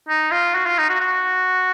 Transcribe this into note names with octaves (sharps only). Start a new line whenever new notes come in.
D#4
F4
F#4
F4
D#4
F#4
F#4